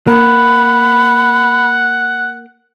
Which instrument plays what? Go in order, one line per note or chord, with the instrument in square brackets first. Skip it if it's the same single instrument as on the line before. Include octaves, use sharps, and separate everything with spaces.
[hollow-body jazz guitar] A#3 [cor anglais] F#5 [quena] B5